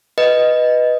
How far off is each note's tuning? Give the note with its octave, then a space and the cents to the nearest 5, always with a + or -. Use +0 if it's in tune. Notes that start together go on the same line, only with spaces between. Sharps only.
B4 +0 D#5 +0